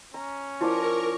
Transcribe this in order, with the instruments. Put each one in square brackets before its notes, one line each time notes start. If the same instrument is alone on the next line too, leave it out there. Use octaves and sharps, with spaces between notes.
[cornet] C#4 [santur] A#5
[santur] F3 D5 D6 [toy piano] E4 [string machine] A#4 C#6